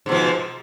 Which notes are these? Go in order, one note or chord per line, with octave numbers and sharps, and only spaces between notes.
G#2 B2 F3